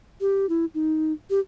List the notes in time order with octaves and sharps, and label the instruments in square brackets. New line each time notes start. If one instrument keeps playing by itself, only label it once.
[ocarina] G4
E4
D#4
G4